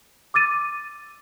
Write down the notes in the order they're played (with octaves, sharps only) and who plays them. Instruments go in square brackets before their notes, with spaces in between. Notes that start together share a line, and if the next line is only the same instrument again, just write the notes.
[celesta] D6 E6 A6 D#7